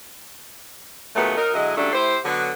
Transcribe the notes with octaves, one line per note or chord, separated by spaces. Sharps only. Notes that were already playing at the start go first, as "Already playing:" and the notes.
D#2 A#2 F#3 G#3 A3 B3
F#3 D#4 A#4
D3 F#3 G#3 E4 D#5
C#3 F#3 G3 A3 D4
A3 E4 G4 C5
D3 F#3 B3